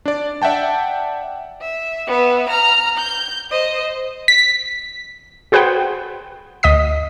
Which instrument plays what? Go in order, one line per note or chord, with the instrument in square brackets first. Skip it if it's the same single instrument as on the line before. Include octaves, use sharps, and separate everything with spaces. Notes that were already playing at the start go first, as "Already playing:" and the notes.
[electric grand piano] D4 D5
D5 E5 F#5 G5 A5
[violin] E5
B3 E5
A#5 F6
G6
C5 D#5
[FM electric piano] B6
[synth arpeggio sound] F#4 G#4 B4 C5 F#5 G5
D2 D#5 D#6 B6